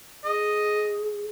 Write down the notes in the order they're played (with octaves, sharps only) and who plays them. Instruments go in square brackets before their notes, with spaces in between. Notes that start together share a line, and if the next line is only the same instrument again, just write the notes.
[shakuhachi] G#4 [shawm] D#5